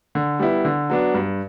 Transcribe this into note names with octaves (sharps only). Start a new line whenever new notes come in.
D3
G3 B3 E4
D3
F#3 B3 D4
G2